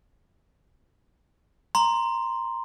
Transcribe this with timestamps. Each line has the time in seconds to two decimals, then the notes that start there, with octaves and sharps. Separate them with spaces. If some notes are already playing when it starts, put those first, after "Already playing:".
1.75 A#5 C6